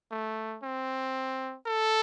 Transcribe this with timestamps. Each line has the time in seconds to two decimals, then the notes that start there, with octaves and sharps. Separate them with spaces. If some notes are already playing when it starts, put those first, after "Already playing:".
0.11 A3
0.63 C4
1.67 A4